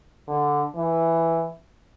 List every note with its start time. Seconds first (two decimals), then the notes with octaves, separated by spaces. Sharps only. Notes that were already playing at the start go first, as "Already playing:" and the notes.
0.28 D3
0.76 E3